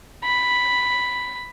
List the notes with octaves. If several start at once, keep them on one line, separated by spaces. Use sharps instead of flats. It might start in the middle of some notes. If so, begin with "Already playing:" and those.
B5